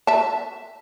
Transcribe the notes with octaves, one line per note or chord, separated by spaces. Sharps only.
E5 A5